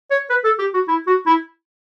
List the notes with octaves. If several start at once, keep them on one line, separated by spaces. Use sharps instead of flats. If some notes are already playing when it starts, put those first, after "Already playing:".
C#5
B4
A4
G4
F#4
E4
F#4
E4